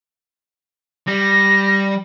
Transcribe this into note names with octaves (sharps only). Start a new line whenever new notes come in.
G3 A#6